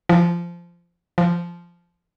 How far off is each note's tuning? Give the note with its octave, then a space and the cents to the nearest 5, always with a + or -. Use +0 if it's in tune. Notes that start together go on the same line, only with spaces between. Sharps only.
F3 -15
F3 -10